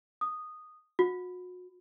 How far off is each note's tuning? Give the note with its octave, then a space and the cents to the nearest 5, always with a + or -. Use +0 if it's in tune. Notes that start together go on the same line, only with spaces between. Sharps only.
D#6 -10
F#4 -35